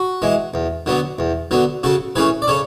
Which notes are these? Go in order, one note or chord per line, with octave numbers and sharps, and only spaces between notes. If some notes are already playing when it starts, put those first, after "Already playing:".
Already playing: F#4
E3 G#3
E2
D3 F#3 B3
E2
D3 F#3 B3
C#3 F#4 A4
E3 A3 C#4 G#4 B4
D5
C#3 A4 C#5